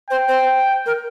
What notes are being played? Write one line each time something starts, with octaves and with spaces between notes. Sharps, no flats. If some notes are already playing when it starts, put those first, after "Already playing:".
C5 G5
C5
A#4